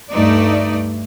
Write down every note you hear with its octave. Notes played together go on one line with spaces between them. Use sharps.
D2 G2 A3 D#4 D5